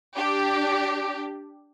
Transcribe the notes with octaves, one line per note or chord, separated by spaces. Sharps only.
D4 G4